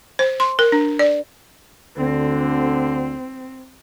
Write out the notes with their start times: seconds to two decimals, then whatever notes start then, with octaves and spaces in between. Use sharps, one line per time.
0.19 C5
0.40 C6
0.59 A#4
0.72 D4
0.99 D5
1.97 D2 D3 C4